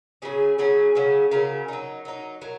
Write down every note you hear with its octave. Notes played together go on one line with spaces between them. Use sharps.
C#3 F#3 C#4 G#4
C#3 F#3 C#4 G#4
C#3 F#3 C#4
C#3 F#3 C#4 A#4
F#3 D#4
F#3 D#4
F#3 A#4